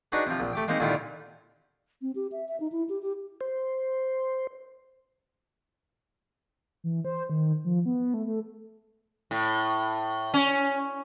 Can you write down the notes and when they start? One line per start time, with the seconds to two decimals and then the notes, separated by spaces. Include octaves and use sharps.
0.12 D4 D#4 F#4 G#4 B4
0.27 C3 F3
0.40 A#1
0.53 A3 G4 G5
0.68 G#3 A#3 C4 D#4 G#4
0.80 A#2 D3 D#3 G3 E4 F4
2.02 C4
2.15 G4
2.32 E5
2.48 E5
2.60 D#4
2.72 E4
2.89 G4
3.02 G4
3.41 C5
6.84 E3
7.05 C5
7.30 D#3
7.65 F3
7.86 B3
8.14 A3
8.27 A3
9.31 A2
10.34 C#4